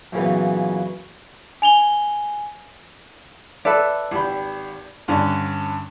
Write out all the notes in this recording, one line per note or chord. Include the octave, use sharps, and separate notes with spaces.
F#2 A#2 C#3 E3 B3
G#5 F7 G7
A4 B4 D5 E5
G#1 G4 B5
G2 D3 C#4